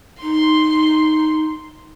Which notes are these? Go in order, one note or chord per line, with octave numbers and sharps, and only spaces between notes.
D#4 C6